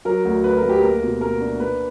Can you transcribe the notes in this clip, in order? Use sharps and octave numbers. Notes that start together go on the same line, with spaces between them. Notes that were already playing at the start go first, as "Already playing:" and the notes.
F#3 A#4
D2
D2 B4
A#4
D2
G4
A#3 A#4
B2
A#3 A#4
D4
A#3 B4